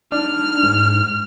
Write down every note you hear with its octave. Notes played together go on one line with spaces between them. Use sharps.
D4 D#4 F6
G#2